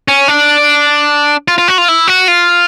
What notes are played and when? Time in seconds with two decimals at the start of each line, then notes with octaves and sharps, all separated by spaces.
0.08 C#4
0.28 D4
1.48 F4
1.58 F4
1.68 F#4
1.78 F4
1.88 E4
2.07 F#4
2.28 F4